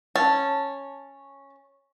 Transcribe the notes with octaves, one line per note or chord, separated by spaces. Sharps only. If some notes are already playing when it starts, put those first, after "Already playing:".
C#4 A5